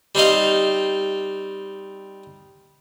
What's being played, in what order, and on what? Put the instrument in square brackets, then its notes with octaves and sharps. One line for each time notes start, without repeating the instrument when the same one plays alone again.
[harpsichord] G3 C4 D#4 F5